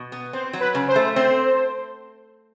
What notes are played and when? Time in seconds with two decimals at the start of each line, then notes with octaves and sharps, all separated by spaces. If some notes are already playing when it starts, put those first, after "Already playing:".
Already playing: B2
0.12 B3
0.33 C4 C5
0.53 F#3
0.60 B4
0.75 C#3
0.88 C5
0.96 A3
1.16 C4 C5